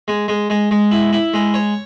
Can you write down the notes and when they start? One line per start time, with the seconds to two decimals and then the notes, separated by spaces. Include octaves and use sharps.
0.08 G#3
0.28 G#3
0.50 G#3
0.71 G#3
0.91 E4
1.13 E4
1.34 G#3
1.54 C#5